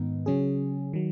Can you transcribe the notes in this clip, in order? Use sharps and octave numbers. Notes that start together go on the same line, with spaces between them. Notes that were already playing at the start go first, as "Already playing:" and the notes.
Already playing: G#2 D#3 B3 D#4
C#3 F#3 C#4 G#4
D#3 F#3